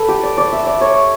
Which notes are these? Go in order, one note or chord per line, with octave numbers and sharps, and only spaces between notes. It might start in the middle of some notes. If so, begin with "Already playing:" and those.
Already playing: A4 B4
G4
D5
D5
E5
D5
C#5